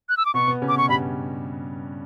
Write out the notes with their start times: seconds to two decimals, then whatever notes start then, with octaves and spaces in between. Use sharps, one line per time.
0.09 F#6
0.17 E6
0.26 D6
0.34 B2 B3 C#6
0.47 B2 B3
0.62 C#3 C#4
0.68 D6
0.75 B2 B3 C#6
0.89 G2 G3 B5